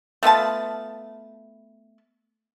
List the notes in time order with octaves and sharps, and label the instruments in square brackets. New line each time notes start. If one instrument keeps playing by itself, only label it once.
[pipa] A3 B3 F4 A5